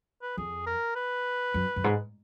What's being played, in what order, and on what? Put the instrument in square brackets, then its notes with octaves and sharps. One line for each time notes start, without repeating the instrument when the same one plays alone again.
[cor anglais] B4
[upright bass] F2 [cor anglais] G#4
[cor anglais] A#4
B4
[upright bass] F#2
F#2
G#2